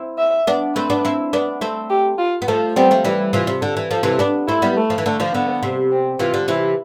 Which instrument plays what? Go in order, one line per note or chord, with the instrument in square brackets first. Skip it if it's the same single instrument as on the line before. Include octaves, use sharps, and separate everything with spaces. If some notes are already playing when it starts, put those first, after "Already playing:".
Already playing: [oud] C4 E4
[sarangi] E5
[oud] B3 D4
[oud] A3 C4 [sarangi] B4
[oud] B3 D4
C4 E4
B3 D4
[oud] A3 C4 [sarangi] A4
[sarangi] G4
F4
[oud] B3
[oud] F3 A3 [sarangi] A4
[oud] G3 B3 [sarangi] C4
[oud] F3 A3
[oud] E3 G3 [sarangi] E4
[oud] C3 E3 [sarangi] F4
[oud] C3
[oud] D3 [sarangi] A4
[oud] E3
[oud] F3 [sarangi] A4
[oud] C3 E3
B3 D4
[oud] A3 C4 [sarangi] E4
[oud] G3 B3
[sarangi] A3
[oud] F3
E3
[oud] D3 [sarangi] A3
[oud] D3 F3
[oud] D3 [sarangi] B3
[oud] C3
[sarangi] C4
[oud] C3 E3 [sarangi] F4
[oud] D3
[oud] C3 E3 [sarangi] E4